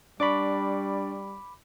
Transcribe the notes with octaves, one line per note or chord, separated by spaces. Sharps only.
G3 D4 D5 B5 C#6 D6